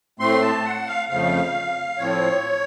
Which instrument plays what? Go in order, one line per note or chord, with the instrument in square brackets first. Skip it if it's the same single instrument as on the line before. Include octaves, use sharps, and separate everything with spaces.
[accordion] A2 A3 C4 C6
A5
F#5
F5
F2 C#3 F3 A3 F5
A2 F3 C4 C#5